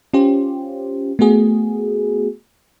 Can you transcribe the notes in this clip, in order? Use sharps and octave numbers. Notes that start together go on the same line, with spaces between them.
C#4 F4 G4 C5
A3 B3 F#4 G#4